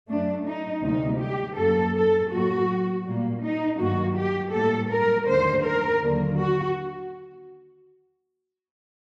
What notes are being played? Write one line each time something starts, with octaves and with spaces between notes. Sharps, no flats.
F#2 F#3 A3 D4
D#4
D2 C3 G3 A#3 D#4
G4
F#2 F#3 A#3 A4
A4
A2 F#3 A#3 F#4
A#2 G3 A#3
D#4
G2 D#3 F#3 A#3 F#4
G4
A2 G3 A#3 A4
A#4
D#2 D3 A3 C5
A#4
D#2 D3 F#3 A#3
F#4